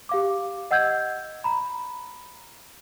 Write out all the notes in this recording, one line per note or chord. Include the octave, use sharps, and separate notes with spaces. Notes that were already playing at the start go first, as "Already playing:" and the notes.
G4 F5 D6
D#5 F#5 E6 G6 G#6
A#5 B5